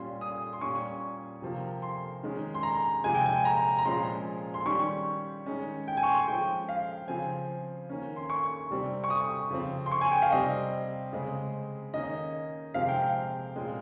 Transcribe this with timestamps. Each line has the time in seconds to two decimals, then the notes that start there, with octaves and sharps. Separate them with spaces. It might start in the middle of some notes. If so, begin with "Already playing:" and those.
Already playing: A#2 G3 C#4 C6
0.21 D#6
0.53 C6
0.61 A#2 G3 C#4 C#6
1.42 C3 F3 A#3
1.82 C6
2.23 D#3 G#3 C#4
2.55 C6
2.63 A#5
3.04 C3 F3 G#3 G#5
3.15 G5
3.26 G#5
3.45 A#5
3.78 A#5
3.85 A#2 F3 G#3 C#4 C6
4.54 C6
4.65 D#3 G3 C#4 C#6
5.46 D#3 G#3 C#4
5.88 G5
5.97 G#5
6.03 C#6
6.07 C6
6.17 G#5
6.27 F3 G#3 C#4 G5
6.69 F5
7.08 C#3 F3 C4 G#5
7.90 D#3 A#3 C#4
8.16 C6
8.30 C#6
8.70 C3 G3 C4
9.04 C#6
9.10 D#6
9.50 C#3 F3 C4
9.86 C6
9.91 C#6
10.01 G#5
10.11 G5
10.22 F5
10.32 C3 G3 C4 D#5
11.13 C#3 G#3 C4
11.94 D#3 A#3 C#4 D#5
12.74 C3 F3 G#3 C4 F5
12.88 G5
13.02 F5
13.56 A#2 G#3 C#4